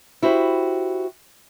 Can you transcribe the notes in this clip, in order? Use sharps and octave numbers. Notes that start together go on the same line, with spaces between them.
E4 F#4 G4 C5